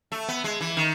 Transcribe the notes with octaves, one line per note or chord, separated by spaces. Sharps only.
A3
B3
G#3
E3
D#3